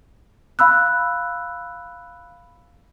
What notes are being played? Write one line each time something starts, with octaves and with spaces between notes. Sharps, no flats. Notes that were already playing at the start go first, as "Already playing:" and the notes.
F5 B5 E6 F#6